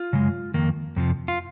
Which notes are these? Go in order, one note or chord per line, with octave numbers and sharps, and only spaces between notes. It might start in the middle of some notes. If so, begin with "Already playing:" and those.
Already playing: F4
F#2 C#3 G#3
F2 D#3 A#3
F2 C3 F3
F4